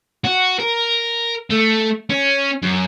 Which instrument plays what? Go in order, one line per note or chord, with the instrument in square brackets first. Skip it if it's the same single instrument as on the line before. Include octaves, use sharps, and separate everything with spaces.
[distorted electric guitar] F#4
A#4
A3
C#4
F#2